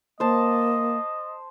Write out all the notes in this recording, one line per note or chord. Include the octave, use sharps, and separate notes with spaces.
A#3 C5 D#5 A5